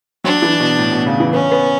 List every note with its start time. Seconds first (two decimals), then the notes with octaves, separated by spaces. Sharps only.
0.24 F#3 D4
0.42 E3
0.60 B2
0.79 A2
0.92 B2
1.06 C#3
1.20 E3
1.33 B3 C#4
1.52 B3